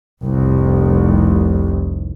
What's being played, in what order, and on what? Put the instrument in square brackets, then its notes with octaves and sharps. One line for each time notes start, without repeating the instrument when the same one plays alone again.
[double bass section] F1 C2